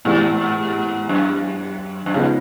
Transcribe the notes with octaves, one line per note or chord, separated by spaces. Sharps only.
G#2 C3 E3 G#3 B3
F#2
F#2
G2 C#3 F3 G#3 B3 D#4